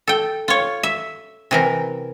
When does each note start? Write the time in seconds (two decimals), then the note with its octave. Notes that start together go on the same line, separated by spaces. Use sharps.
0.07 A4 G5
0.48 F4 C#5
0.83 E5
1.51 C3 E3 A#4